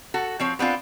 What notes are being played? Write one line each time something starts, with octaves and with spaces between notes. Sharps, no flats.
F#4 A4
F3 C4 C#5
B3 C4 D4 F4